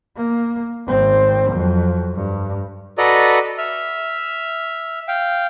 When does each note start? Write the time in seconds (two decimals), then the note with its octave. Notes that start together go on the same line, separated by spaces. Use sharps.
0.17 A#3
0.87 G#1 C4
1.52 F2 F#3
2.15 G2
2.98 F#4 A4 B4 D5 D#5 A#5
3.58 E5 F6
5.08 F5 G5